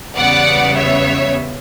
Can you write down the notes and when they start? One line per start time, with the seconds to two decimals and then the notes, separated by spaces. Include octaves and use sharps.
0.16 E2 C#3 G3 B3 D5 F#5
0.76 C#5 E5